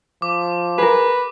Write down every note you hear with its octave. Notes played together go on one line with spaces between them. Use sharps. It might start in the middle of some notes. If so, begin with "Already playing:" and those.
F3 D6
G#4 A#4 B4